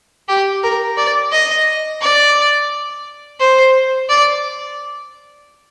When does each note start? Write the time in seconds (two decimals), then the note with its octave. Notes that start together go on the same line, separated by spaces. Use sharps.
0.28 G4
0.63 A#4
0.97 D5
1.32 D#5
2.01 D5
3.40 C5
4.09 D5